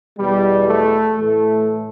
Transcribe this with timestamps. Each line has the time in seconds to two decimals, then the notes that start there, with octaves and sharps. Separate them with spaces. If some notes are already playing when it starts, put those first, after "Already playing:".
0.17 E2 B2 G3
0.66 A3
1.15 A2 E3 A3